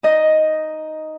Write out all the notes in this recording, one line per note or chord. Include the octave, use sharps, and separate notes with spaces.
D#4 D#5